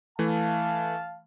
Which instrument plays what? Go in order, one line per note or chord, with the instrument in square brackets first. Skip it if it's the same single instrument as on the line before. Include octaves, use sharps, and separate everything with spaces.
[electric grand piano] E3 A3 [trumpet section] F5 A5